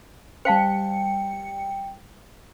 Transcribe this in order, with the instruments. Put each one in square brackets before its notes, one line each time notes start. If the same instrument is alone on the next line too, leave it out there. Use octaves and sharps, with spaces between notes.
[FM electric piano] G3 C#7 [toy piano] C5 F5 A5 [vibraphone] G5